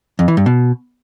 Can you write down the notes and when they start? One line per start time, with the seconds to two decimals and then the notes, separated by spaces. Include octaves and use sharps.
0.19 F2
0.28 E3
0.37 G2
0.46 B2